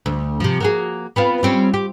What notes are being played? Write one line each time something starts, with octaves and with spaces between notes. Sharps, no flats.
D2
C3 F3
A#3 F#4 G#4
B3 C4 F4
G3 C4 C#4
G4